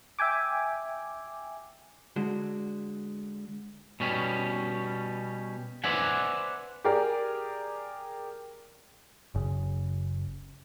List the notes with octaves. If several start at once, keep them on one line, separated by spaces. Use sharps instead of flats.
E5 G5 G#5 D6
D3 G#3 F#4
B2 G3 C#4
B4 C5 D5 E5 F#5 G#5
G4 G#4 A#4 D5
F#1 C#3